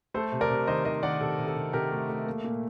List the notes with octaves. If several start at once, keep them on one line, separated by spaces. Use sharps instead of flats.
A3 A4 C5
C3
A#4 D5
C3
D#3 C5 D#5
D#3 C5 D#5
D#3 D5 F#5
C3 A4
C3
A4
C3
C3 G4 A#4
A3
A3
A#3
A#2